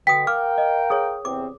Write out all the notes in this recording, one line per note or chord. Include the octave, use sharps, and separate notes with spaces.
B2 D3 G5 D#6 B6
A#4 F5 G5 D6 F6
D#5
G#4 C#5 D#6
E2 C3 C4 D6